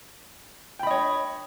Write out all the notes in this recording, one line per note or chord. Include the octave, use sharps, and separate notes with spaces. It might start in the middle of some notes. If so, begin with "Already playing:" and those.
C#5 D#5 G5 B5